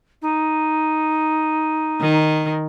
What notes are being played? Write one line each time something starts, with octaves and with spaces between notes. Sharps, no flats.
D#4
D#3